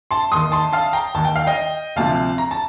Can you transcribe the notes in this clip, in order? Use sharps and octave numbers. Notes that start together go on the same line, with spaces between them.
A5 C6
D#2 D#3 C6 D#6
A5 C6
F5 A5
G5 A#5
D#2 D#3 A5
G5
F5
D#5 G5
D2 C3 F3 F5 A5
A#5
A5